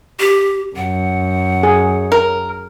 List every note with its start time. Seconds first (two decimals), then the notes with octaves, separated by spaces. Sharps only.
0.20 G4
0.76 F#2 F#5
1.63 G#4
2.12 A#4